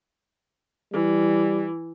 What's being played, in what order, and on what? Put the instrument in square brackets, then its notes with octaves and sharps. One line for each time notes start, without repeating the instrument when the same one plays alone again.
[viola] E3 [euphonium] G3